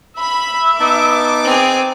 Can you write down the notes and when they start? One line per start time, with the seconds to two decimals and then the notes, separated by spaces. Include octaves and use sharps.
0.19 E5 B5
0.80 B3 D#4 A5 D6
1.44 C4 G#4